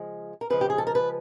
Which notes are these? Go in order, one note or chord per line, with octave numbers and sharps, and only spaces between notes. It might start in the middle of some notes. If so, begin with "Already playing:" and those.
Already playing: C#3 F3 G#3
A#4
C#3 F3 G#3 B4
G4
G#4
A4
A#4
B4